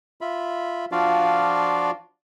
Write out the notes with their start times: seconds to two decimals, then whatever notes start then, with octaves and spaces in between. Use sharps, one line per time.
0.21 F4 E5 B5
0.92 F3 D4 F4 F#4 D5 F5